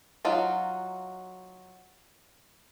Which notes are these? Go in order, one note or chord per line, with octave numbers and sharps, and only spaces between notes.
F#3 D#4 F4 F#4